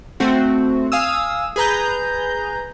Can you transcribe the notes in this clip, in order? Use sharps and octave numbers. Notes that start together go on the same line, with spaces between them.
A3 C4 F#4
F5 G#5 D#6 E6
G#4 B4 A#5 G6